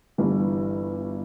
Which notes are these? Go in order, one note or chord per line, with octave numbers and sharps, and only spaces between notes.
G1 G2 E3